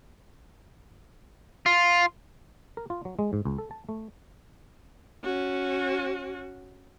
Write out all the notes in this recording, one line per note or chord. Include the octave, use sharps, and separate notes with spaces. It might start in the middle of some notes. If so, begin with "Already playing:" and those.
F4
A#4
F4
F#3
G#3
G#2
C#2
A4
A5
A3
C#4 F#4